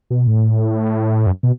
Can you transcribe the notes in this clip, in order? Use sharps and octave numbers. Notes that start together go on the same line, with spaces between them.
B2
A2
F#2
B2